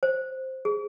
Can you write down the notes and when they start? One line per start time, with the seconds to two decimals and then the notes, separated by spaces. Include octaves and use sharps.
0.03 C5
0.65 G#4